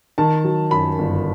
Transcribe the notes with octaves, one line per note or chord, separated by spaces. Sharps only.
D#3 A5
F#3
F#2 B5
G1